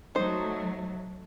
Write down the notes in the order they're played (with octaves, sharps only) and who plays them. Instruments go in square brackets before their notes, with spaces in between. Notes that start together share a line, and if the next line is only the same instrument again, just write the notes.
[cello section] F#3 A3 [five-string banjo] D#4 C5